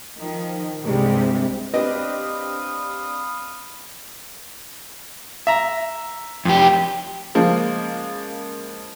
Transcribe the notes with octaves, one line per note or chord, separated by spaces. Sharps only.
D#3 F3
C2 G2 C3 G3 G#3
C4 D4 G4 B4 D#5 F5 B5 D#6
E5 A#5
F2 G4
C#3 F3 G#3 A#3